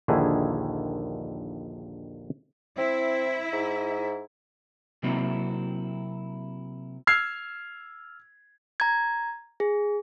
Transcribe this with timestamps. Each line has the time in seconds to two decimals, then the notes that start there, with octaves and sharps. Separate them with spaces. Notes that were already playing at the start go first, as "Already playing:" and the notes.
0.08 A#1 D#2 D3 D#3 E4 G#4
2.78 C4 E4 E5
3.52 G#2
5.03 C3 F#3 A#3 C4 E4 F#4
7.07 E6 F6 G#6 C7
8.80 A#5 G#6
9.60 G#4